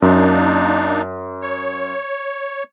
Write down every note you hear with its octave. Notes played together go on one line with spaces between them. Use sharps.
F#2 A#3 D4 D#4
C#5